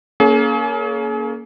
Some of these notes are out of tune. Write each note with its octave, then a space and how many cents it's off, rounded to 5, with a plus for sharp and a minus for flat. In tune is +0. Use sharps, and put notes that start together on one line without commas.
A#3 +0 C#4 +15 G#4 +40